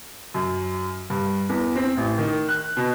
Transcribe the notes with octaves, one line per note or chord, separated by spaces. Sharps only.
F#2
G2
E2
C4
A1
D#3
F#6
B2